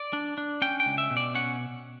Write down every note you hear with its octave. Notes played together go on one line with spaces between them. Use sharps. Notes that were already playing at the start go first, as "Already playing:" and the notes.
Already playing: D5
D4
D4
C#4 G5
G5
C#2
E5
B2
D5
C#4 F#5